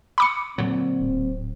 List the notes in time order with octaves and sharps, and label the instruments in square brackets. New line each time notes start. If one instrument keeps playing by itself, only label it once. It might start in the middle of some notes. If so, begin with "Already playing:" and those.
[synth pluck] B5 D6 C#7
[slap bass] A#2 D3 F#3 [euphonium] C4
[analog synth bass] D1